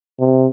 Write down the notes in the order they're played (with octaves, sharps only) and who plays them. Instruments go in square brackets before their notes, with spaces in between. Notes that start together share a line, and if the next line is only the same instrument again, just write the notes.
[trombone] C3